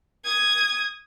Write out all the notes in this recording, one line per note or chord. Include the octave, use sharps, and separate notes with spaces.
D#6 G#6